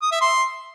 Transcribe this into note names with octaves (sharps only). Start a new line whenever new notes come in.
D#6
E5
C6